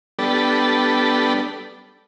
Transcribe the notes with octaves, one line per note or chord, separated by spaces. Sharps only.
G3 B3 D4 A4